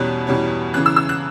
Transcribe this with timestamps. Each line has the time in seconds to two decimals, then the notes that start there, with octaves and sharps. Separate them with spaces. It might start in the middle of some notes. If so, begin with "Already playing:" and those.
Already playing: E2 B2 G3 C#4 F#6
0.27 E2 B2 G3 C#4
0.73 E2 C#3 E3 F#6
0.86 E6
0.96 E6
1.09 F#6